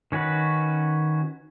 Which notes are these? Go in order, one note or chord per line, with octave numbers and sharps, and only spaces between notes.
D#3 C#4 F#4 B4